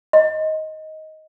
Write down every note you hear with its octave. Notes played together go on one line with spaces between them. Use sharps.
D#5